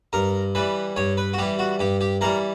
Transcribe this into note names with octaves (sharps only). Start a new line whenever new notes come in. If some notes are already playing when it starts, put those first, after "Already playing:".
G2 A#4
E3 G3 B4
G2 C#5
B4
F#4
E3 G3 G4
F#4
G2 G4
G4
E3 G3 A#4